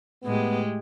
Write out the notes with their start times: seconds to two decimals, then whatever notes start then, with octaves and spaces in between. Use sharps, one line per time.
0.24 A2 G#3 B3 G4